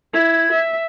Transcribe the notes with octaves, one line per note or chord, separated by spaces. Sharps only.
E4 G#6
E5